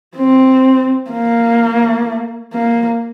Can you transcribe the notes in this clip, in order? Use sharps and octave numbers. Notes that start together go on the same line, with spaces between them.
C4
A#3
A#3